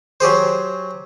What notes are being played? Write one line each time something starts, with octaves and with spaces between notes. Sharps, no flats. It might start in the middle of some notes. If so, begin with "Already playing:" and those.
F#3 G4 G#4 C5